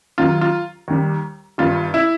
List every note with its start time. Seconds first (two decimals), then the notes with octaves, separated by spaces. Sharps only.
0.18 D#2 D#3 F#3 F4
0.41 F4
0.88 D#2 D#3 G3
1.58 G1 G2 D#3 F4
1.94 E4